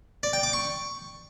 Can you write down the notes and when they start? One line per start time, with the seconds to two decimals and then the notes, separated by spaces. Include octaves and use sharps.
0.23 D5
0.33 G5
0.43 D6
0.53 C#6